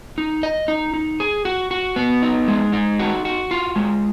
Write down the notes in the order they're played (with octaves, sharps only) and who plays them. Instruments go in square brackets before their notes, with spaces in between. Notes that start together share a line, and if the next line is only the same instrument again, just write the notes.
[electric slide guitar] D#4
D#5
D#4
D#4
G#4
F#4
F#4
B3
D#4
G#3
D#4
F#4
F#4
F4
G#3